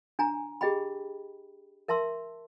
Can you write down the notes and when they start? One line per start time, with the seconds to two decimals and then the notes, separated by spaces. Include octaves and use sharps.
0.19 D4 G#5 A#5
0.61 G4 G#4 D#5 G5 B5
1.88 A#4 E5 A5 C6 E6